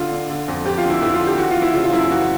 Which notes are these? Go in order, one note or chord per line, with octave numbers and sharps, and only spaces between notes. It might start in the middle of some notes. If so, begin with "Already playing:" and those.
Already playing: D3 F4
D3
D3
F2
F2 G4
F4
D3
E4
F2 E4
F4
D3
G4
E3 F#4
F4
E3
E4
C#3 F4
F4
F#2 E4
E3 F#4